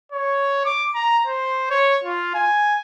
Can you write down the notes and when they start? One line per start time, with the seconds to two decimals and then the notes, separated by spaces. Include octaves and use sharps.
0.12 C#5
0.65 D6
0.95 A#5
1.27 C5
1.70 C#5
2.04 F4
2.34 G#5